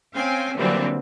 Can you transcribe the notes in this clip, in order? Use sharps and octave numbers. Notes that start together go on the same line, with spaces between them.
C4 C#4 F5 G5 G#5
A#2 D3 E3 F#3 G3 C4